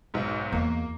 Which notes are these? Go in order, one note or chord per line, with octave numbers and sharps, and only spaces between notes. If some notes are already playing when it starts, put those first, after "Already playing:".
B1 G#2
E2 A#3